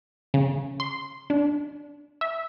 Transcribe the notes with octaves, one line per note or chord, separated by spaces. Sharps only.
C#3
C6
D4
E5